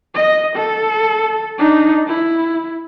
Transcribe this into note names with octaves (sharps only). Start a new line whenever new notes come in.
D#5
A4
D4 D#4
E4